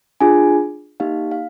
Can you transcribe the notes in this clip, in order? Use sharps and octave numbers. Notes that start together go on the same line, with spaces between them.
D4 F4 G#4 G#5
A#3 D#4 G4 F5
F5